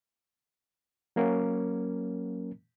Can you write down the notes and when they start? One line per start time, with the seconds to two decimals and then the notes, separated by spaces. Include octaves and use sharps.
1.16 F#3 A#3 C#4 A#4